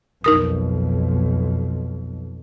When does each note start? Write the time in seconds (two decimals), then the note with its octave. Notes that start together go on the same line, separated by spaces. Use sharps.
0.24 B1 F2 D#4 A#4 D#6